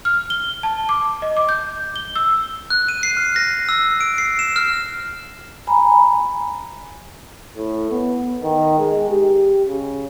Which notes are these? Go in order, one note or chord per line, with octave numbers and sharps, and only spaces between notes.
F6
G7
A5
D6
D#5
D6
G6
G7
E6
F#6
D#7
C7
F6
A#6
E6
D7
C7
E7
F6
G#5 A#5 B5
A2
B3
D#3
G#3
G4
C#3